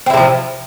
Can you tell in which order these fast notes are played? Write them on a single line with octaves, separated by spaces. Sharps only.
C4 E4 C3 F3